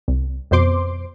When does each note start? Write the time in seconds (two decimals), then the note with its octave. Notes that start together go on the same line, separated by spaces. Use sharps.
0.08 C2
0.51 F2 B2 C5 C6 D6